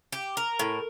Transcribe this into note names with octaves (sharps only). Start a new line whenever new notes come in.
G4
A#4
A2